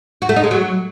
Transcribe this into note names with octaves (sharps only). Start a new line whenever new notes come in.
F#4
A3
D#4
G#3
F#3